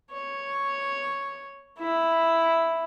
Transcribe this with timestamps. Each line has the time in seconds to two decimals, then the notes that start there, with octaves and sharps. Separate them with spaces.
0.12 C#5
1.79 E4